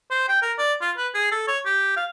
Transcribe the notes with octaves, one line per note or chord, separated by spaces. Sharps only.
C5
G5
A#4
D5
F4
B4
G#4
A4
C#5
G4
F5